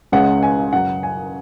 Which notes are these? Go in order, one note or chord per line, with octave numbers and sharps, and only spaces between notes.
C#2 C#3 G#3 C#4 F#5
G#5
F#2 C#3 F#3 F#5
G#5